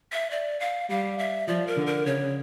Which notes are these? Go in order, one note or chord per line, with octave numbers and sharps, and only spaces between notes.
E5
D5
F5
G3 F5
E5
F3 D5
A#4
D3
A#4
C#3 C#5